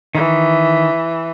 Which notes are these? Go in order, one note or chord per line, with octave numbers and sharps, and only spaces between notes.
D#3 E3